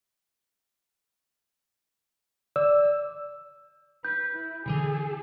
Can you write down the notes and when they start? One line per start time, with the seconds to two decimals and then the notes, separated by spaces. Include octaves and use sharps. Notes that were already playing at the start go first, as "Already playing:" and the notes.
2.56 D5 E6
4.05 B4 G6
4.36 E4
4.66 B2 D3 E3 G#4 A4